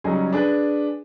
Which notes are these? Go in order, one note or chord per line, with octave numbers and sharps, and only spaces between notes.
C#3 F#3 G3 C#4 D#4 G#4
D4 G#4 B4